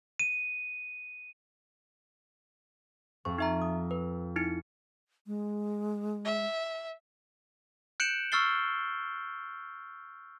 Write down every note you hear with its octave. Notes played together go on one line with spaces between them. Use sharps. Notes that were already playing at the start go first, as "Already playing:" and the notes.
D#7
F2 C#6
D#4 E5 A#5
D#6
B4
D#4 E4 C#7
G#3
E5
F#6 G6 C#7 D7 E7 F#7
C#6 E6 F6 A6 C7 G7